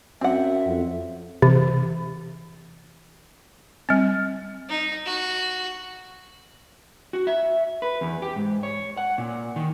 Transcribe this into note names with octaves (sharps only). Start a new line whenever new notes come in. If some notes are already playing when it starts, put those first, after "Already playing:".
F#2 C4 E5 F#5
F2
C3 E3
G3 C4
D#4
F#4
F#4
E5
B4
E2
G4
G#2
C#5
F#5
A#2
D#3